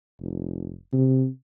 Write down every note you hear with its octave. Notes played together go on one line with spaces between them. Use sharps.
F1
C3